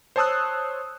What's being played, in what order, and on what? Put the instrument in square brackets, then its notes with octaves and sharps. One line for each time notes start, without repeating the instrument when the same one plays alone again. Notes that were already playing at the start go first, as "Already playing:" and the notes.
[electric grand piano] C5 C#5 A5 D#6 E6 F#6